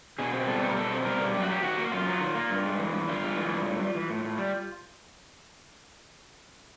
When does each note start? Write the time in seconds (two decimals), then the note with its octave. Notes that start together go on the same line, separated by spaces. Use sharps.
0.19 B2 G#4
0.33 C4
0.47 G3 A4
0.62 B2 A4
0.70 A#4
0.76 B2 A4
0.90 C4
1.05 G3 A#4
1.20 B2
1.34 F#2 G4
1.43 F#4
1.49 F#3 G4
1.63 D#3 F#4
1.77 A#3
1.92 F#2 F4
2.07 F#3
2.21 D#3
2.35 A#3
2.50 G2
2.65 G#3
2.79 E3
2.93 G2
3.08 G2 F4
3.23 G#3
3.37 E3
3.52 G2
3.66 A2
3.80 G3
3.95 E3
4.10 A2
4.25 A2
4.38 G3